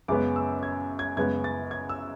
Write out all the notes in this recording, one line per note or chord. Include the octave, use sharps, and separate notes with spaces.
F#2 C#3 G#3 B3 D6
E6
G#6
G#6
F#2 C#3 G#3 B3 G#6
A6
G#6
E6